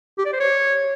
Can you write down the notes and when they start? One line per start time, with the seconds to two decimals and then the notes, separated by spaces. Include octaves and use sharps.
0.18 G4
0.26 D5
0.33 C5
0.40 C#5